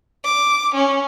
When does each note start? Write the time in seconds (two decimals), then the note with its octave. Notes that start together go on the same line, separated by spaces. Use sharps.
0.25 D6
0.74 C#4